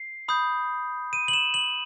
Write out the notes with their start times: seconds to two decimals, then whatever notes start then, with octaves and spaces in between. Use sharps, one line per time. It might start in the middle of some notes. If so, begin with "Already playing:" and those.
Already playing: C7
0.28 B5 D#6 G6
1.13 D#7
1.28 F#7
1.33 E7
1.54 F#7